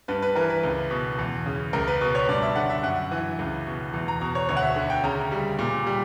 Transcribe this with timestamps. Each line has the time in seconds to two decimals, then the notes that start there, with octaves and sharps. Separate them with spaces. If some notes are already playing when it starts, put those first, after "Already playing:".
0.08 G2 B4
0.22 B4
0.36 E3 A#4
0.50 B4
0.63 C#2
0.91 B2
1.18 E2
1.46 C#3
1.73 C#2 A#4
1.88 B4
2.01 B2 B4
2.15 C#5
2.29 G2 D5
2.42 E5
2.56 D3 F#5
2.70 E5
2.83 F#2 F#5
3.11 E3
3.39 C#2
3.66 B2
3.94 E2
4.08 A#5
4.21 B2 A#5
4.35 C#5
4.49 D2 C#5
4.57 F#5
4.62 E5
4.76 D3
4.90 G5
5.04 C#3 A#5
5.32 G3
5.59 A#2
5.87 G3